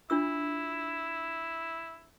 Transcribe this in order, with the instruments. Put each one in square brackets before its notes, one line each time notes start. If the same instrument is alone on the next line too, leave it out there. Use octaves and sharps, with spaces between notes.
[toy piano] D4 F4 E6 [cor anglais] E4